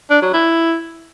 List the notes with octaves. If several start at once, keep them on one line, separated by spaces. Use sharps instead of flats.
D4
F#3
E4